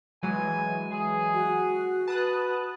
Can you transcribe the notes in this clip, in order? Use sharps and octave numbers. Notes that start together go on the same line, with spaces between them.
E3 F#3 G#3 G#5
G#4
F#4
B4 A5 D#6 F#6